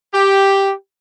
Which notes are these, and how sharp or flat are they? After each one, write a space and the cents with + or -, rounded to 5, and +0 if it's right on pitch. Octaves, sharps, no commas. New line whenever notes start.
G4 +0